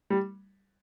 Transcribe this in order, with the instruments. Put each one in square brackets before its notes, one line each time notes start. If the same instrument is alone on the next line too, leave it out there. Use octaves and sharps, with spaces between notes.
[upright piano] G3